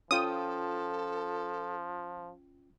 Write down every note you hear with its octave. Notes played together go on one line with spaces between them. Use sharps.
F3 C#4 F4 A4 G5 D#6